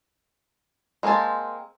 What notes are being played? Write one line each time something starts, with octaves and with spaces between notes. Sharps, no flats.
G#3 A#3 C4 G#5 A5